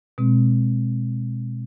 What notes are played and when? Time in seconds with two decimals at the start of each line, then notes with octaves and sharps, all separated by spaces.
0.18 B2 G#3 C4